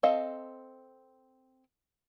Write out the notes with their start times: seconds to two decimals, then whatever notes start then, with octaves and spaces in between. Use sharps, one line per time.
0.03 C4 A4 D#5 F5